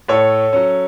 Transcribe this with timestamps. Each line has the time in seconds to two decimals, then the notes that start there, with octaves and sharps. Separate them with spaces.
0.08 A2 A4 C#5
0.53 F#3 C#4